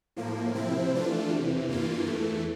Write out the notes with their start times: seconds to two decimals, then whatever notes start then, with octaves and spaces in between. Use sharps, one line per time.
0.16 A2 F3 A#3
0.54 C3 F3 C4 E4
0.93 E3 A3 D4 F4
1.30 E2 C3 E3
1.68 G2 E3 A#3 F4
2.06 E2 E3 A3